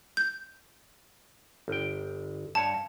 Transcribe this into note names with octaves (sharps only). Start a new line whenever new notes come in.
G6
G1 G5
G2 C#5 A5